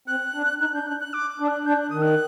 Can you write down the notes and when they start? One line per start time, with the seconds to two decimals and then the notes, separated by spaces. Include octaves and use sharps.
0.08 C4 F#6
0.34 D4
0.60 D#4 F#6
0.74 D4 G6
0.87 D4 F#6
1.00 F#6
1.14 D6
1.31 D6
1.40 D4
1.48 F#6
1.66 D4 G6
1.78 F#6
1.90 D#3 D#6
2.02 F#6